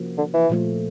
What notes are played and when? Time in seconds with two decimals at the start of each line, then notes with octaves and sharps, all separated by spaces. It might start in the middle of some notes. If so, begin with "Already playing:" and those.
Already playing: C3 F3 A#3 C#4 F#4
0.18 D3
0.34 E3
0.49 A#2 F3 A3